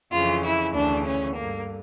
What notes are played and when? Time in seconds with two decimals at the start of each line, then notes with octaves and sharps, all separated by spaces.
0.11 F2 C#3 E3 F4
0.43 E4
0.73 D2 C#3 E3 D4
1.05 C#4
1.36 G2 D3 A#3